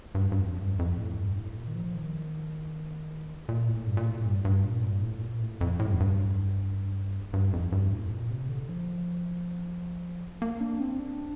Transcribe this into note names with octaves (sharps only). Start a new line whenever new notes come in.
G2
G2
F2
G2
F2
A2
G2
A2
A#2
D#3
F3
D#3
A#2
A2
G2
A#2
A2
G2
G2
A#2
G2
A2
A#2
A2
F2
A2
G2
F2
G2
G2
F2
G2
A2
A#2
C3
D3
F3
A#3
D4
C4
D4